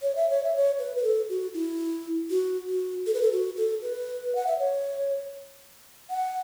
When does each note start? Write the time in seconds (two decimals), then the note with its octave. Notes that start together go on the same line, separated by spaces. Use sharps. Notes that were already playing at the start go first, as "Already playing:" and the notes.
0.02 C#5
0.15 E5
0.30 C#5
0.43 E5
0.56 C#5
0.79 B4
0.96 B4
1.03 A4
1.29 F#4
1.54 E4
2.30 F#4
2.68 F#4
3.06 A4
3.14 B4
3.22 A4
3.32 F#4
3.57 A4
3.82 B4
4.35 F#5
4.47 E5
4.59 C#5
6.10 F#5